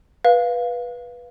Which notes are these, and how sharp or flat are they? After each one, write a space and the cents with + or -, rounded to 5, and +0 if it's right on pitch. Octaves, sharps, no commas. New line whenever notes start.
B4 -10 F5 +0